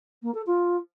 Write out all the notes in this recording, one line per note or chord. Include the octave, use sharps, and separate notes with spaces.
A#3
A4
F4